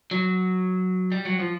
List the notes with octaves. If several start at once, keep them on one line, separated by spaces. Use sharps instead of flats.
F#3
G3
F#3
F3